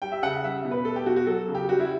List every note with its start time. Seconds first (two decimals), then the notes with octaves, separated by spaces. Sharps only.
0.02 G3 G5
0.12 E5
0.22 C#3 F#5
0.44 G3 E5
0.65 B2
0.71 B4
0.85 A3 A4
0.96 G4
1.06 B2 F#4
1.16 F#4
1.26 F#3 A4
1.48 C#3
1.55 G4
1.69 G3 F#4
1.80 E4